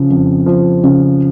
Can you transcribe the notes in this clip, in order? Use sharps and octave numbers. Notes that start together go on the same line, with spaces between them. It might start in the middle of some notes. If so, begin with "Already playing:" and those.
Already playing: C#3 F3
F2
F3
C#3